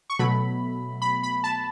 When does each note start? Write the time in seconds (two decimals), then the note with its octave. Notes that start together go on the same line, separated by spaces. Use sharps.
0.10 C#6
0.19 B2 F#3 A3 B5
1.02 B5
1.23 B5
1.44 A5